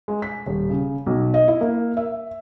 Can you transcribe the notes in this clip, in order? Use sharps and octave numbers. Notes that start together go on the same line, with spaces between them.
G#3
B6
D#1
C#3
B1
D#5
E4
A#3
E5